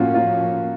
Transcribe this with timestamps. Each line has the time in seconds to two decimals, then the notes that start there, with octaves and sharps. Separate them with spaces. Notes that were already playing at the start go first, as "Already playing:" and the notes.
Already playing: A2 F3 A#3 C#4 F4 F#4
0.14 F4